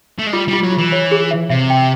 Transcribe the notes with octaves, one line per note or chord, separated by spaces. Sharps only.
A3
G#3
G3 F4
G3
F4
F#3
F4
E3
C#5
G#4
E5
C3 E5
G5